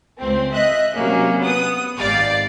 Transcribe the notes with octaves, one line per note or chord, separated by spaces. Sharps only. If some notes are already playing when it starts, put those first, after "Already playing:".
C#2 C4
D#5 E5 F#6
C3 F#3 A#3 C#4
B3 D#6
G#1 G4 D5 F5